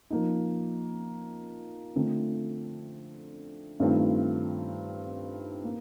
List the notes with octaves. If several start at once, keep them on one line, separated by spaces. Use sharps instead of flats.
F3 A#3 D#4
D3 A3 C4 F4 A4
G2 D#3 A3 C4 F4
A#3